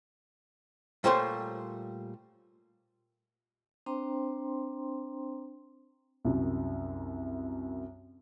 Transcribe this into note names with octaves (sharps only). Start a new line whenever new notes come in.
A#2 G3 A3 C5 C#5 C6
C4 D4 C5 G5 A#5 C6
C2 F#2